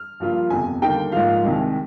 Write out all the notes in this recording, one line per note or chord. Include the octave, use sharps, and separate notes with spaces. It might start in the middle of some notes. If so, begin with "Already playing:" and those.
Already playing: F6
G2 F3 A#3 F4
G1 F2 C3 G#5
D#2 D3 G3 A#3 D#4 G5
G#2 F3 A#3 F4 F5
C2 C3 D#3 G#3